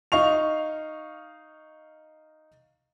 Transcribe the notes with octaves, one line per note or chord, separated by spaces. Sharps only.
D#4 F5 C#6 F7